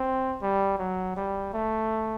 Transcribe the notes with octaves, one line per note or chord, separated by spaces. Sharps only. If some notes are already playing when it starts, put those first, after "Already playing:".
Already playing: C4
G3
F#3
G3
A3